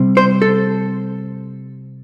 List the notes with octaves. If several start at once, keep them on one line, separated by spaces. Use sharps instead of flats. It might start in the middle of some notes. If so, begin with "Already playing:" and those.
Already playing: C3 G3 C4
C5
A4